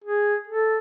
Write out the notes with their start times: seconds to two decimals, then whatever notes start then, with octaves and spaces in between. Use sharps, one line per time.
0.04 G#4
0.48 A4